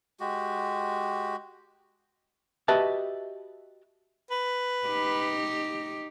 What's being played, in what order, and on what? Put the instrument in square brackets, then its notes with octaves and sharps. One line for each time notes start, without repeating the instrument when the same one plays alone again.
[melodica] G#3 F#4 G4
[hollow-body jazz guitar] F#4 G4 B4 D#5 E5 A5
[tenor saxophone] B4
[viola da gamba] D#4 G4